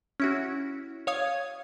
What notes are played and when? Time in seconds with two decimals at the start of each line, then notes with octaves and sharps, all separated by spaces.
0.20 C#4 E4 F#4
1.07 C#5 F5 D#6 G#6